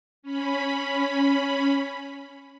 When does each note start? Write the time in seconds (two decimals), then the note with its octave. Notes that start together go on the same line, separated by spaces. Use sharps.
0.23 C#4 B5